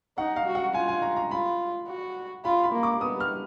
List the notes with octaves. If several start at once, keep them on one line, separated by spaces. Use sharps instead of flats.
D#4 F#5
F5
F#4
F#5
F4 G#5
G#5
A#5
A#5
F4 B5
F#4
F4 B5
B5
A#3
D6
B3 D#6
F6